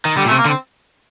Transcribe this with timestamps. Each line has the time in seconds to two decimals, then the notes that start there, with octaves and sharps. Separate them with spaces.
0.05 D#3
0.17 D3 G3
0.25 A#2
0.28 A3
0.31 C3
0.38 A#3
0.45 D3
0.48 C4